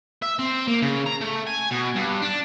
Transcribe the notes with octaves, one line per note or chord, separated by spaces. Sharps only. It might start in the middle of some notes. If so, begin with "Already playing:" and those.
E5
C4
A#3
C#3
A#5
A3
G#5
B2
G2
D4